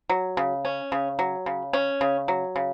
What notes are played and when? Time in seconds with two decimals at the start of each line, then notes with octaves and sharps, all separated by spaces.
0.09 F#3
0.37 C#3
0.65 C#4
0.92 C#3
1.19 F#3
1.46 C#3
1.73 C#4
2.01 C#3
2.28 F#3
2.56 C#3